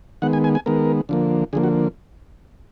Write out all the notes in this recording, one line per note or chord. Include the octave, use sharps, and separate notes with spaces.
D#3 G#3 B3 F#5
G#5
G#5
G#5
D#3 G#3 B3 A#4
D3 F3 A#3
D3 F3 A#3 G#4
F#4